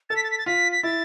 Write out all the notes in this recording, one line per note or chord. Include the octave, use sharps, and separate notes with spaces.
A4 A6
B6
A6
B6
A6
F4 B6
B6
E4 A6